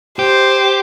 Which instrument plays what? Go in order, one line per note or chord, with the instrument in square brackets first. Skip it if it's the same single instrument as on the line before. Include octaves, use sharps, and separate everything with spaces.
[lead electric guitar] G4 [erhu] C5